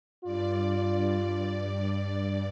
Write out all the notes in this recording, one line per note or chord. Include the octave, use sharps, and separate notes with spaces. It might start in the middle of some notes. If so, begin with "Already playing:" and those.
G2 F4 D5